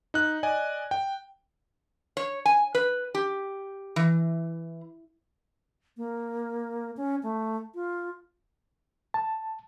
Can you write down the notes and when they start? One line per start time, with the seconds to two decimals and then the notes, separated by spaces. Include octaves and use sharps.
0.14 D#4 F#6
0.43 D5 D#5 G#5
0.91 G5
2.17 C#5
2.45 G#5
2.75 B4
3.15 G4
3.96 E3
5.97 A#3
6.97 C#4
7.23 A3
7.75 F4
9.14 A5